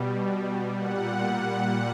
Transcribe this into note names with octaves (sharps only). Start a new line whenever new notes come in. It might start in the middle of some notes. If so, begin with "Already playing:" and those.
Already playing: B2 G3
A#2 G3 F#5